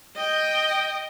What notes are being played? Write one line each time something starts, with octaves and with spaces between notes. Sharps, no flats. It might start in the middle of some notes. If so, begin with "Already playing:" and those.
D#5 G5